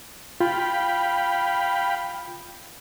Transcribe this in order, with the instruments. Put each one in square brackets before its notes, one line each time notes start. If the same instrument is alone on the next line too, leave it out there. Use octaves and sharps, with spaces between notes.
[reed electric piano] F4 [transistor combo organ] F5 G5 B5